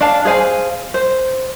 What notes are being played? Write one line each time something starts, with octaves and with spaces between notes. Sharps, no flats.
D4 F5 A5
G#4 C5 F5 G#5
C5